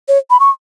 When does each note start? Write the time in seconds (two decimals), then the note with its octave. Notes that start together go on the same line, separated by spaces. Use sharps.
0.08 C#5
0.30 B5
0.40 C#6